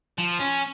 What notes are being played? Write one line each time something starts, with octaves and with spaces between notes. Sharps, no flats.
F3
C#4